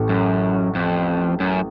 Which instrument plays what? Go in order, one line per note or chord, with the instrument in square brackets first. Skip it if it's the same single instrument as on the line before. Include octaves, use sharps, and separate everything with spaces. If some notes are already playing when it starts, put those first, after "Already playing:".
Already playing: [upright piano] A1 A2 A3
[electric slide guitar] F#2
F2
F#2